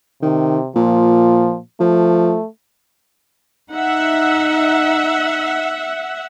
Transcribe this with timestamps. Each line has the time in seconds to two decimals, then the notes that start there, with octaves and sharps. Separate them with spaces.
0.22 C3 D#3
0.76 A#2 F3
1.80 F3 A3
3.73 D#4 E5 F#5